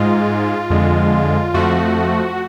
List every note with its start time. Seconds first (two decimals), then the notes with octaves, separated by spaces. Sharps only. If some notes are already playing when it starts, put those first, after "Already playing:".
Already playing: G#2 G#3 F4
0.70 F2 D3 G#3
1.54 F2 F3 A3 F#4